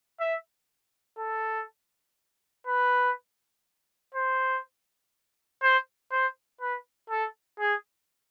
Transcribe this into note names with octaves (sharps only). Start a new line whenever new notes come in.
E5
A4
B4
C5
C5
C5
B4
A4
G#4